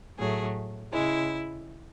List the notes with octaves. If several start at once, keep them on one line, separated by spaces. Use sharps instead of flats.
A2 F#3 A3 G#4
C#3 G#3 E4